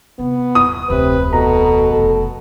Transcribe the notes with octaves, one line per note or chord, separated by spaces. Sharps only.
C3 B3
D#1 D#6
D1 F2 C3 B4
B2 A4 A#5
F1 F3 A4